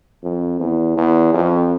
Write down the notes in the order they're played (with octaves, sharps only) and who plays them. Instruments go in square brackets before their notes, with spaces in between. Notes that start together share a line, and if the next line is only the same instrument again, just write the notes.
[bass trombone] F2
E2
E2
F2